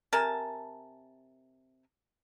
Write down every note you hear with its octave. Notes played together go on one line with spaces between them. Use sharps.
C3 A#4 G#5 A5